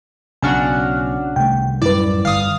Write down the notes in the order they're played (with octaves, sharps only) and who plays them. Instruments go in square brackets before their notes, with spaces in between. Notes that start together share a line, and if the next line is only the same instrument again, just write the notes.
[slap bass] B1 [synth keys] C#3 D4 F#4 [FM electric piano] G#5 F6 F#6
[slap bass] C2 A3 [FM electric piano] G5
[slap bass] F#2 A2 G3 [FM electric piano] E4 B4 [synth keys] D5
[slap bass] G1 [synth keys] F5 D#6